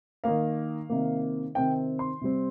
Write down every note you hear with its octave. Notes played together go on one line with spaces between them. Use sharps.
D#3 A#3 F5
C3 D#3 A#3
C3 D#3 C4 G5
C6
C3 G3 C4